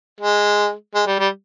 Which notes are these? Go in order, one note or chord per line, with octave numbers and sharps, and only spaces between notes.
G#3
G#3
G3
G3